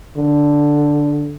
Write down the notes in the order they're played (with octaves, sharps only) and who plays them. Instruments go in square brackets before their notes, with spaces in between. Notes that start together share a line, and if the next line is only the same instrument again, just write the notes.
[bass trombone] D3